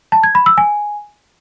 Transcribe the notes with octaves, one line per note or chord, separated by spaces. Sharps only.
A5
G#6
B5
E6
G#5